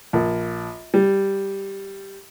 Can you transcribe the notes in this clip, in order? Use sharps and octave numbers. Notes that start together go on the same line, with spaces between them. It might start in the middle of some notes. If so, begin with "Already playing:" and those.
A#1
G3